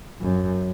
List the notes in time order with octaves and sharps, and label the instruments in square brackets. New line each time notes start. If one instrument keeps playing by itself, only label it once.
[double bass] F#2